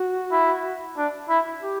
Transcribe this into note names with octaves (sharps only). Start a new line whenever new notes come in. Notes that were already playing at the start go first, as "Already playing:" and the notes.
Already playing: F#4
E4
D4
E4
G4